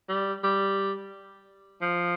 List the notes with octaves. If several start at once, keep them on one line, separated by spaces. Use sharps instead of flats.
G3
G3
F3